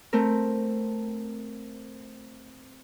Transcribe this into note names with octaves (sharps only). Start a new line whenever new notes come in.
A3 C4 A#4